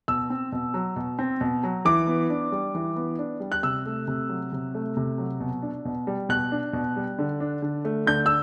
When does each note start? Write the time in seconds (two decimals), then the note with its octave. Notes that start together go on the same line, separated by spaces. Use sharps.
0.08 B2 E6
0.30 C4
0.52 B2
0.74 F#3
0.96 B2
1.19 C4
1.41 B2
1.63 F#3
1.85 E3 D6
2.07 B3
2.30 D4
2.52 G3
2.75 E3
2.96 B3
3.19 D4
3.40 G3
3.52 F#6
3.63 C3 E6
3.86 A3
4.08 C3
4.29 F#3
4.52 C3
4.74 A3
4.97 C3
5.18 F#3
5.40 B2
5.62 D4
5.85 B2
6.07 G3
6.29 B2 F#6
6.52 D4
6.73 B2
6.96 G3
7.19 D3
7.40 D4
7.62 D3
7.85 A3
8.06 D3 G6
8.26 E6